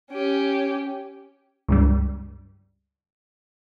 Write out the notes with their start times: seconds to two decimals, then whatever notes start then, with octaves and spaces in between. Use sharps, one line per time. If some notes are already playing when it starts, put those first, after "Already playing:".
0.11 C#4 G4
1.69 C#2 G2 G3